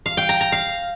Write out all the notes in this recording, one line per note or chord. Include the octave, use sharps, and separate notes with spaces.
F5
G5
A#5
A#5
F5